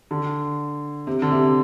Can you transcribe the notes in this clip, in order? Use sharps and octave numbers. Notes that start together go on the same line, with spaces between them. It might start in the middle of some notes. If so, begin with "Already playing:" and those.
D3
C3
D3
C3